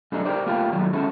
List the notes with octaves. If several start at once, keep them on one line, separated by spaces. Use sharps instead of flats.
F#2 G3 A3 D4 D#4
G4 A#4 C5 D5
A3 A#3 F4 G4 B4
D#3 F#3 G3 A3
G#3 C#4 E4 F#4 A4